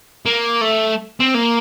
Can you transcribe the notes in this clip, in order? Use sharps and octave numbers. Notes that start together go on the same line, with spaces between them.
A#3
A3
C4
A#3